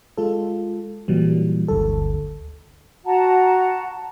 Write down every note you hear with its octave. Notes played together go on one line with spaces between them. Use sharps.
G#3 F4 A4
A#2 E3 F#3 G3
G1 D2 A4
F#4 F#5 A5 A#5